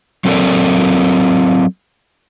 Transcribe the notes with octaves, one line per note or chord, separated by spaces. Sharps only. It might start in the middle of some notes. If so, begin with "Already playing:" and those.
F#3 C4 A4 A#4 D5